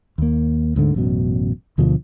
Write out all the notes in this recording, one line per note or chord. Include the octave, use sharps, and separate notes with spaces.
D#2 A#3
D2 G#2 D3
A1 F#2 B2
D2 B2 D3 F3